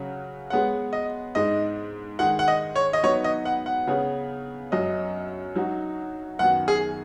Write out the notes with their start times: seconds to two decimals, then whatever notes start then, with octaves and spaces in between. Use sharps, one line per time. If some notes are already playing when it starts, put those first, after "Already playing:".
Already playing: C#3 F#3 C#4 F#4
0.50 G#3 B3 G#4 C#5 F#5
0.93 D#5
1.35 G#2 G#3 D#4 D#5
2.19 D#3 G#3 D#4 G#4 F#5
2.39 F#5
2.48 D#5
2.76 C#5
2.93 D#5
3.03 F#3 B3 D#4 B4 C#5
3.24 D#5
3.45 F#5
3.66 F#5
3.87 C#3 B3 G#4 C#5
4.71 F#2 F#3 C#4 D#5
5.56 F#3 D#4 F#4
6.39 F#2 D#3 B3 F#4 F#5
6.68 G#4